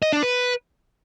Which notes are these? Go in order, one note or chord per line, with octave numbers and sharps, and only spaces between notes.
D#5
D4
B4